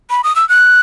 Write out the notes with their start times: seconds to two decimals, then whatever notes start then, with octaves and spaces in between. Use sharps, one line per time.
0.10 B5
0.24 D#6
0.36 E6
0.49 F#6